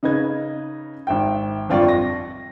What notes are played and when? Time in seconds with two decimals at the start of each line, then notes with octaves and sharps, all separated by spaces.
0.03 C#3 D#4 B4 G#6
1.07 G#1 E5 G5
1.69 G1 F2 F4 D5 G5 C#6
1.89 A#6